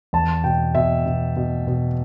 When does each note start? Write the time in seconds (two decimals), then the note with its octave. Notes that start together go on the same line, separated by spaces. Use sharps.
0.13 E2 A5
0.44 B2 G5
0.75 B2 E5
1.06 B2
1.36 B2
1.67 B2